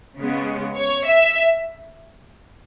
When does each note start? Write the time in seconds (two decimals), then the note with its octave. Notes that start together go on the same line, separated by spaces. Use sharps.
0.18 C#3 G#3 B3
0.77 C#5
1.06 E5